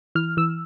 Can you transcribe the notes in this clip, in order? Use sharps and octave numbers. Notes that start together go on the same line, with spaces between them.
E3 F6
E3 E6